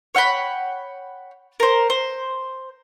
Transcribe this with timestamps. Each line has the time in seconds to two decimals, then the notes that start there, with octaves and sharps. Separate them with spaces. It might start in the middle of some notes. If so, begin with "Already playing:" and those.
0.15 C#5 F#5 G5 B5
1.60 A#4 C5
1.90 C5